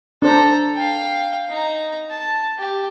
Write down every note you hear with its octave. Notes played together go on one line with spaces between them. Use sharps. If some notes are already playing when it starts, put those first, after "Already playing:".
D4 A4 C5 A#5
F5 G5
D#4 A#5
A5
G4